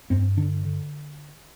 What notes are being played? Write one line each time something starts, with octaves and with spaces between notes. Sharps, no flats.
G2 C4
D3 D4
D3